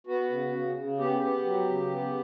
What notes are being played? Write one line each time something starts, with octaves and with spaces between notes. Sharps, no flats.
B3 F#4
C#3
C#3
C#3
B3 G4
B3
F#3
C#3
B3